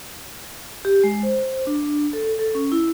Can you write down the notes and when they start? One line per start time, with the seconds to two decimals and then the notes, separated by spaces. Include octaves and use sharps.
0.85 G4
1.04 G#3
1.23 C5
1.67 D4
2.13 A4
2.39 A4
2.55 C#4
2.72 E4